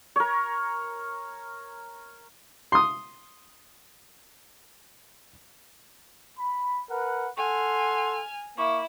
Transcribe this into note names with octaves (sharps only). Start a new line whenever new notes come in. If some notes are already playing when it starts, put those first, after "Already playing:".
A#4 C#5
C6 D#6
B5
A#4 B4 F#5
A4 F#5 G#5 C6 F6
A#3 E4 C#6 D6